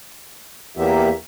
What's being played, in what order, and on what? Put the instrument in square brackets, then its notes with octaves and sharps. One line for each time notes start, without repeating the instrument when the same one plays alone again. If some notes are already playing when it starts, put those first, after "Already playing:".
[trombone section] E2 [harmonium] A#3 G4 E5